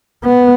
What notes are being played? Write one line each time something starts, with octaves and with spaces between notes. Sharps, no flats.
B3